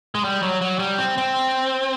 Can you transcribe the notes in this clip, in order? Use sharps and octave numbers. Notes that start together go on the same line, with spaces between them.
G#3
G3
F#3
F#3
G3
C4
C4